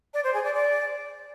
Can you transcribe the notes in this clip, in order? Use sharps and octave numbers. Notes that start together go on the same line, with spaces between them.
D5
C5
G#4
D5
D5